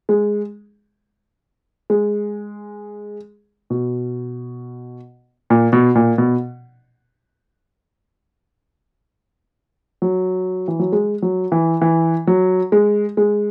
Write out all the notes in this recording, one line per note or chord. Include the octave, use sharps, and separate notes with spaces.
G#3
G#3
B2
A#2
B2
A#2
B2
F#3
E3
F#3
G#3
F#3
E3
E3
F#3
G#3
G#3